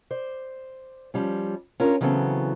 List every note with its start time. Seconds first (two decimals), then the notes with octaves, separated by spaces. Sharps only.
0.11 C5 D5
1.14 F3 G3 C#4
1.80 C#4 D4 F4 A#4
2.01 C#3 E3 F#3 B3 C4 A4